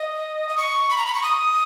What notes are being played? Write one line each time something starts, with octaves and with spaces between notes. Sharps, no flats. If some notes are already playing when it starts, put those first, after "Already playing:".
Already playing: D#5
D#6
C#6
B5
A#5
B5
C#6
D#6